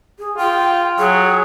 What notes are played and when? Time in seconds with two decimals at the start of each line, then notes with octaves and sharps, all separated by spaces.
0.19 G#4
0.37 F4 G5
0.98 F#3 G#4